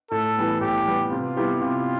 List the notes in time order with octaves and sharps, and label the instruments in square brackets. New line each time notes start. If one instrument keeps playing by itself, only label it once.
[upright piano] A2 [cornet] A4
[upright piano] E3 G3 B3
[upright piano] A2 [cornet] G4
[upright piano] E3 G3 B3
[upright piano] C3 [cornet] F4
[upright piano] G3 B3 E4 G4
[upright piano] C3 [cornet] F4